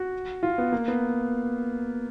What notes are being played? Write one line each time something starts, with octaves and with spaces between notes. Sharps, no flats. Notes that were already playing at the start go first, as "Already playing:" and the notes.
Already playing: F#4
F4
B3
A#3
B3